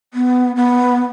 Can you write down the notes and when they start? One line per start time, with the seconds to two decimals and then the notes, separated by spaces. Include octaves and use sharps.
0.14 B3
0.56 B3